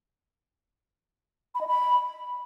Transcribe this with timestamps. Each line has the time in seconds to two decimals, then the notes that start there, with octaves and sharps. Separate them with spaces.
1.55 B5
1.61 D#5
1.67 B5